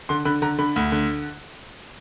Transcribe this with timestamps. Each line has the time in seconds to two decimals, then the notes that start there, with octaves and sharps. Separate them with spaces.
0.09 D3 C6
0.25 D3 B5
0.42 D3 A#5
0.58 D3 B5
0.76 D2
0.92 D3